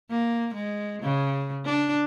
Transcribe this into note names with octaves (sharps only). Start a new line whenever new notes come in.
A#3
G#3
C#3
D4